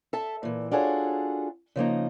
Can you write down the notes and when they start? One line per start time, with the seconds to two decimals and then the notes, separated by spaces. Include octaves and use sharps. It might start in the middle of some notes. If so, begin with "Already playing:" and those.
0.13 A4 E5 A5
0.43 A#2 E3
0.71 D4 F4 F#4 G#4 A4 C#5
1.76 C#3 F3 A#3 D#4